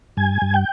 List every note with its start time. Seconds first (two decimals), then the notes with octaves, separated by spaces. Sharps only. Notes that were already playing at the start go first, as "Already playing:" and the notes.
0.17 G2 G#5
0.42 G2
0.54 G5